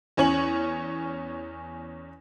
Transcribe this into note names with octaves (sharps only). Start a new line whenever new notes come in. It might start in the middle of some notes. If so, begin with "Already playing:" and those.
E2 C#4 C#5 G#5 F#7